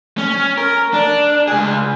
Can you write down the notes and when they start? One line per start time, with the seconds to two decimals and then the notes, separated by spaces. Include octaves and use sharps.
0.18 C#4
0.57 A#4
0.94 D4
1.48 C#2 G#4